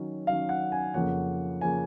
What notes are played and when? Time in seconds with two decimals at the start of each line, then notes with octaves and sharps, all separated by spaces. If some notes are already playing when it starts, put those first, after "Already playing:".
Already playing: D#3 F#3 C#4
0.27 D#3 F#3 C#4 F5
0.49 F#5
0.72 G#5
0.94 F2 C#3 F3 A#3 C#4 F#5
1.61 C#3 F3 A#3 C#4 G#5